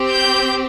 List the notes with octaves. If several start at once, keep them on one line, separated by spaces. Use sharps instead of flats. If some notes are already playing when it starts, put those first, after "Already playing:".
Already playing: C4 G4
G6